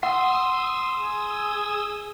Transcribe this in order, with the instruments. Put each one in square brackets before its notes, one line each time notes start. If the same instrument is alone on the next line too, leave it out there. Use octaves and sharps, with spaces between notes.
[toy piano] F#5 [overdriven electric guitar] C6 [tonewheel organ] D#6 E6
[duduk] G#4